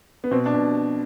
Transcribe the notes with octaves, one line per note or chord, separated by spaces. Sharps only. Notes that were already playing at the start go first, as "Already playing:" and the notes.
B3
B2 C4
D4
B2